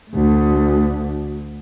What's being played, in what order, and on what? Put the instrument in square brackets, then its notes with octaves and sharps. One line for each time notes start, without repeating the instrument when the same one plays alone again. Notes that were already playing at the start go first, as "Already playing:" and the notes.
[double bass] D2 A3